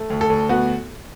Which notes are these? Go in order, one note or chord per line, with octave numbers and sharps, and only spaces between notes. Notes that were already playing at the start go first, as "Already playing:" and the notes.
Already playing: A3
D2
A4
D2
B3 F#4